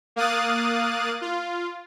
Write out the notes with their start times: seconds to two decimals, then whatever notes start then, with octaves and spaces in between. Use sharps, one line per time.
0.16 A#3 F5 D#6 F#6 A6
1.21 F4